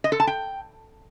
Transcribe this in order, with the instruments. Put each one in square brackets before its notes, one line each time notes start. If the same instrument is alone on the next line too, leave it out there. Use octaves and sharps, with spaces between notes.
[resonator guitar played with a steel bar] D#5
A4
A5
G5